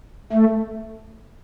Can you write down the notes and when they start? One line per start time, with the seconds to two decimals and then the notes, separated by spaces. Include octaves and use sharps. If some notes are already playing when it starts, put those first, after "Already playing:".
0.33 A3